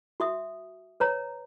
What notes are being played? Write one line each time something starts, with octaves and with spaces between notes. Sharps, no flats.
F#4 E5 D#6
B4 C#5 A#5